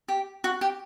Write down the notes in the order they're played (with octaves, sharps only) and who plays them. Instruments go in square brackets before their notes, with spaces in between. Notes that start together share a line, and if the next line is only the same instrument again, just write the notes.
[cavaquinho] G4
F#4
G4